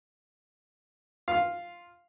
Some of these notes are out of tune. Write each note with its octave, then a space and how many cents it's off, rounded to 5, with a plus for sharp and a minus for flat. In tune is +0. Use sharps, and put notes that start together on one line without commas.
F4 +0 F5 +0